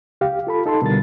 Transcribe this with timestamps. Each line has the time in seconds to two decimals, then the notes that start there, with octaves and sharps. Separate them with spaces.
0.21 C#2 G4 F5
0.47 F4 A4 B5
0.66 D#4 A4 A5 C6
0.82 B2 D3 G3 A#4 A6